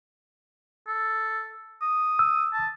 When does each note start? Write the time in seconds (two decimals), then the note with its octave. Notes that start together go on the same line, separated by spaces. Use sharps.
0.88 A4
1.82 D#6
2.19 E6
2.53 A5